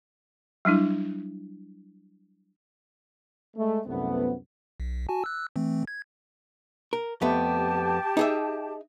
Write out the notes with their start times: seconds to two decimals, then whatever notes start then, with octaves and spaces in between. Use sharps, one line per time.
0.65 F#3 G3 D4 E4
3.57 G#3 A3
3.86 C2 F#2 C3 A3 B3
4.80 B1
5.09 F#4 G#5 A5
5.24 E6 F#6
5.56 E3 A3 C4
5.87 G#6
6.93 A#4
7.21 F2 A3 B3 G4 A5
8.17 D#4 G#4 E5